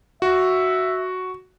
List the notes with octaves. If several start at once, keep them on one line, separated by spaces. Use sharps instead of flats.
F#4 E5